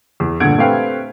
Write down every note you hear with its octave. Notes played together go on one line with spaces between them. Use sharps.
E2
G1 A#2 D3 F#5 G#6 D7
A3 C4 G4 B4 F5 G5